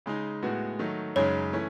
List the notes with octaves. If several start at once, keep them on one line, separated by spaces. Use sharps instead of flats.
C#3 G#3 D#4
A2 G#3 B3 F#4
D#3 F#3 A3 D#4
F#2 C#3 G#3 D#4 C#5
E3 A3 C#4